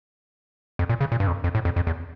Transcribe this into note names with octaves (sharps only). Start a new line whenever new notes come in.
F2
A#2
C#3
A#2
G2
F2
F2
A2
F2
F2
E2